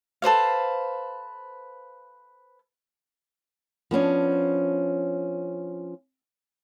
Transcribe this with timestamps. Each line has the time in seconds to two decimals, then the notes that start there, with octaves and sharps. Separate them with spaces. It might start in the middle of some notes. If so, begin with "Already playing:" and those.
0.22 A4 B4 C5 F5
3.91 F3 B3 C#4 D4